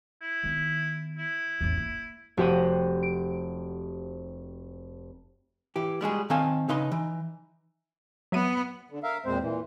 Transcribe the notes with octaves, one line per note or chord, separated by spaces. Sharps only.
E4
D#3 B3
E4
A1 E2
A#3
F1 F#4 G4 C5 F#5 D#7
D7
E3 G4
G3 G#3 F#4 G#4
D#3 C4 A4 F5 G#5
C#3 D#4 B4 D#5 C6
E3 D#4
F#3 B3 E5 D#7
D3
A#4 E5 F5
E2 A#2 G#3 C4 C5
A#2 E3